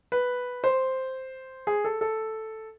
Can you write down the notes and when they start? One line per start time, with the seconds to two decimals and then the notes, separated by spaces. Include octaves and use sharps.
0.12 B4
0.64 C5
1.67 G#4
1.85 A4
2.01 A4